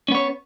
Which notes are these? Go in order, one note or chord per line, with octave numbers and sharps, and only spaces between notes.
B3 C#4 C#5